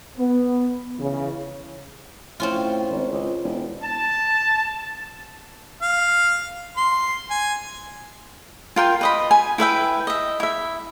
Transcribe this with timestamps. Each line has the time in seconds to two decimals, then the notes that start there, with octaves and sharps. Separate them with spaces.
0.18 B3
0.98 C#2 C#3 E3
2.40 A2 C4 C#4 F4
2.90 G#1
3.11 C#2
3.43 E1
3.82 A5
5.82 F5
6.77 C6
7.30 G#5
8.76 F4 A#4 G5
9.01 B4 D#5 B5
9.31 G#5
9.58 E4 B4 E5 G5
10.07 D#5 E5
10.40 E4 E5